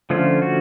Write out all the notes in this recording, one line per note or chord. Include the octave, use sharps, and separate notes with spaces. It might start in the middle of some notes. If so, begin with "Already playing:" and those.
D3 F3 A3 C#4 F4
F#4